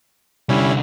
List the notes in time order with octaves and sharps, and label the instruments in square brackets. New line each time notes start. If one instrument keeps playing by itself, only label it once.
[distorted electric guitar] C2 D3 [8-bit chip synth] G3 C#4 E4